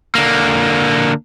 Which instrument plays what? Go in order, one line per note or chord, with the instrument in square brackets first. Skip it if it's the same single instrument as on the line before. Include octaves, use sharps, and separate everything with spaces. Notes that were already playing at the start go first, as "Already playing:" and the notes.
[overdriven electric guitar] D3 A#3